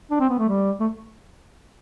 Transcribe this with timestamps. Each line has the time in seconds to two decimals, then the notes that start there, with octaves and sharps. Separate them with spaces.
0.11 D4
0.20 C4
0.29 B3
0.39 A3
0.48 G3
0.80 A3